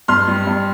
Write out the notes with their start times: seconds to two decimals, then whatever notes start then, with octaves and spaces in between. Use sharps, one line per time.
0.08 G2 C6 F6
0.28 G3
0.47 G2